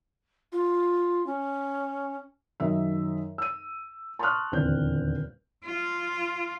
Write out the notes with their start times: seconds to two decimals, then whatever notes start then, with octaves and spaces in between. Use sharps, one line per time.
0.52 F4
1.26 C#4
2.60 F#2 D#3 D#5 E5
3.38 E6 D#7
4.19 A5 C6 C#6 D#6 F6 F#6
4.52 D#1 E2 D3 C4 G6
5.65 F4